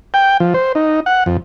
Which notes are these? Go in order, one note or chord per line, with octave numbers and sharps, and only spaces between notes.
G5
F3
C5
D#4
F#5
F2